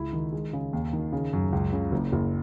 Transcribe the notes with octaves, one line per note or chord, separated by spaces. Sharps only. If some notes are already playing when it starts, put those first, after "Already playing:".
Already playing: C#2 E4
D#3
G#3
C#3
D#2
D#3
C#3
F#2
C#2
C#3
F#1
F#1